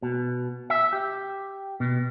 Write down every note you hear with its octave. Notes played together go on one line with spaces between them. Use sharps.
B2
E5
G4
B2